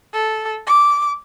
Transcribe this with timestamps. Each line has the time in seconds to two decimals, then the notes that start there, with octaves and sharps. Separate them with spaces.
0.14 A4
0.67 D6